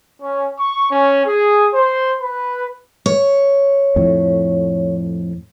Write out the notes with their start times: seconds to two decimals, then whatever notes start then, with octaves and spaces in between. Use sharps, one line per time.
0.21 C#4
0.58 C#6
0.90 C#4
1.26 G#4
1.74 C5
2.22 B4
3.06 C#5
3.96 F2 A2